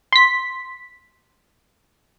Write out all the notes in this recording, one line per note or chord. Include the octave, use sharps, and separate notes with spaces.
C6 B6